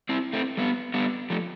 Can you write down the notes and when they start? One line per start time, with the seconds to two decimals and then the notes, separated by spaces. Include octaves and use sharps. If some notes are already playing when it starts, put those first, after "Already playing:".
0.09 C4 E4
0.33 A3 C4
0.57 G3 B3
0.94 G3 B3
1.30 F3 A3